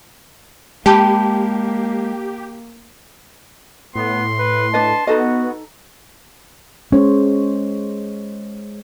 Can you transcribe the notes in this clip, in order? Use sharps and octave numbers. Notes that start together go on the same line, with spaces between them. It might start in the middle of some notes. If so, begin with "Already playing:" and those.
G#3 A#3 G4 G5 A5 B5
A2 B3 C6
B4
D4 B4 D#5 A5
B3 D#4 F#4 A4 D#5
G#3 C#4 C5 C#5